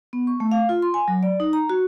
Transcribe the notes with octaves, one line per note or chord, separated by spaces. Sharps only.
B3
C#6
A3
F5
F4
C6
G#5
F#3
D5
D#4
A#5
F#4